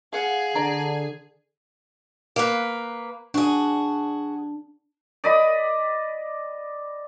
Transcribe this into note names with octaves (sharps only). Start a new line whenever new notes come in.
G#4 F5 F#5
D3 D5 A#5
A#3 B4
D4 F#4 G#4
D5 D#5 B5